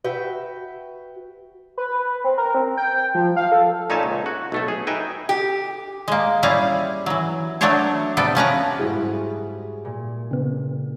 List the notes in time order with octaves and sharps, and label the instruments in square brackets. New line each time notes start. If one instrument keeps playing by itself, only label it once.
[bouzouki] F#4 B4 E5 G5
[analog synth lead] B4
C4
A#4
C4
G5
F3
F5
A4
[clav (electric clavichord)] A#2 D#4 C#5 E5 G#5 A5
C#2
F#4
B1 A3 A4
G#4
D#4 B4 E5 G5 G#5
[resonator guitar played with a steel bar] G4
[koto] G#3 A#3
G3 C#4 E4 G#4 F5
E3 F#3
F#3 A3 B3 D4 C5 C#5
C3 B3 A4 D5 G5
F3 C#4 B4 A#5
[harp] G#2 G3 E4 [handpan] F#4 G#4
[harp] A#2
[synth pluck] C#3 B3